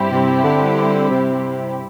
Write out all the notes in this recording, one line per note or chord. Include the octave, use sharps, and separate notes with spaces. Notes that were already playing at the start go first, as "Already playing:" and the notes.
Already playing: G2 G3 C4 E4 G4
C3
D3
C3